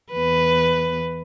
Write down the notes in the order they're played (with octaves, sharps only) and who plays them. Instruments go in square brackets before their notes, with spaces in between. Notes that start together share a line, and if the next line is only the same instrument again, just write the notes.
[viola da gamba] E2 B4